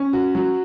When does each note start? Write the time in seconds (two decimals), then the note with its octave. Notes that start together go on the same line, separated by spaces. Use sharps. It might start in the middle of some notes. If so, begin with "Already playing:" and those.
Already playing: C#4
0.13 F#4
0.35 F#3